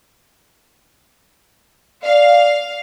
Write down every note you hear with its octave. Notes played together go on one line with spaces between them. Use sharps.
D5 F5